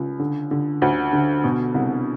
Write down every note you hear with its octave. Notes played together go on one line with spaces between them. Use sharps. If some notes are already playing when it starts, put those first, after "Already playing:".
Already playing: C#2
D3
D3
D2
D3
B2
C2